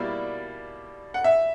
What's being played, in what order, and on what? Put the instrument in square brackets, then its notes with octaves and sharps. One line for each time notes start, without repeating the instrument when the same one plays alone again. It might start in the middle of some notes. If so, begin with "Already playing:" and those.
Already playing: [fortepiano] B2 G3 A#3 E4 [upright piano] D5
[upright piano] F#5
E5